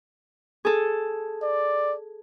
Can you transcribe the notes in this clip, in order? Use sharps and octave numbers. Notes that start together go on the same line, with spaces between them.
G#4 A4
D5